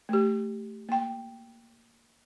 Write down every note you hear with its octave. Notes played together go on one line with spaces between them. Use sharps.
A3 G4
A#3 G5